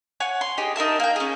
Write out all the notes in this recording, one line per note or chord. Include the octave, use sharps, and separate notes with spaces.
C#5 F#5 G#5
C6
D#4 G4 G#4
D#4 A#4 E5 A5
A#3 G5
C#4 G#4